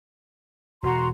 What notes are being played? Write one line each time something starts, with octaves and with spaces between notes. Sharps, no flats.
E1 B2 F#4 A#5 C6